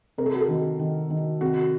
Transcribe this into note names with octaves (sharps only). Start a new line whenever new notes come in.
C3 A#4
A4
F#4
A4
D#3
D#3
D#3
C3 F#4